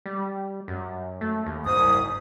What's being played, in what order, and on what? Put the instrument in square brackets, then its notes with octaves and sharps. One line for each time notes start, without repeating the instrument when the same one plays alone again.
[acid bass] G3
F#2
A3
D#2
[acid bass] F#1 [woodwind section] C2 G#2 D#6